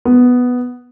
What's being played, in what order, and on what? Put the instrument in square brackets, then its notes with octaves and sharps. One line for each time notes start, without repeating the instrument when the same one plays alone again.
[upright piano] B3